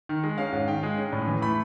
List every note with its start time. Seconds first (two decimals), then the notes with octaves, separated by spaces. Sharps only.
0.09 D#3
0.23 G#3
0.38 C#4 F5
0.52 G#2
0.67 D#3 G5
0.83 G#3
0.98 C#4
1.13 A2
1.27 E3
1.42 A3 B5